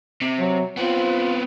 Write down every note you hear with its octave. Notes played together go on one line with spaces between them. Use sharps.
C3
F#3
B3 C4 F4